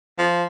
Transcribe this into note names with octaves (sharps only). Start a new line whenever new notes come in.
F3